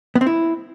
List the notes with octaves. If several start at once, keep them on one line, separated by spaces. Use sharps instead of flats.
B3
C4
E4